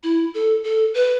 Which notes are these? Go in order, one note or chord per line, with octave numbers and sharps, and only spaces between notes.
E4
A4
A4
B4